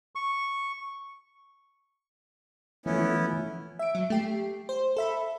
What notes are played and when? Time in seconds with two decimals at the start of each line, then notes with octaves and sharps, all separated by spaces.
0.15 C#6
2.86 E3 F3 A3 B3 C#4 E4
3.79 E5 D7
3.95 F#3
4.10 A3 G4 C7
4.69 C5
4.97 A4 E5 B5